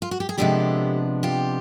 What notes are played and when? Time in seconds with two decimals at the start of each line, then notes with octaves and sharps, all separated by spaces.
0.02 F4
0.11 F#4
0.20 G4
0.29 G#4
0.38 C3 F3 G#3 B3 D4 G4 A4
1.23 F4 G4